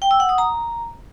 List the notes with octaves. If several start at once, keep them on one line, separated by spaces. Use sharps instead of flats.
G5
E6
F#5
D#6
A#5